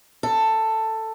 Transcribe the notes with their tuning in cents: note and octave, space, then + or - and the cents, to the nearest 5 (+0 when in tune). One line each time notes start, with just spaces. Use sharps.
A4 +10